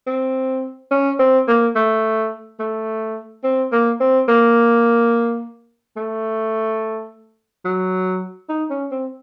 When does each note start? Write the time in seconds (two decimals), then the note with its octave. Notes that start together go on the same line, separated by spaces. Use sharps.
0.07 C4
0.91 C#4
1.19 C4
1.48 A#3
1.75 A3
2.59 A3
3.44 C4
3.72 A#3
4.00 C4
4.28 A#3
5.97 A3
7.65 F#3
8.49 D#4
8.70 C#4
8.91 C4